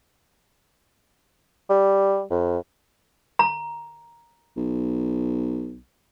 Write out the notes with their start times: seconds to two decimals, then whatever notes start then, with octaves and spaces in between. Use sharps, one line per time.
1.70 G3
2.31 F2
3.39 A#5
4.57 B1